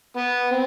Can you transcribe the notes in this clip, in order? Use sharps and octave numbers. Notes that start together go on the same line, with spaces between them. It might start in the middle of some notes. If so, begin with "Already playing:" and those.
B3
C4